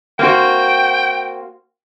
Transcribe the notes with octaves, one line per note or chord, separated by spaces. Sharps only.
A#3 C4 F#4 G5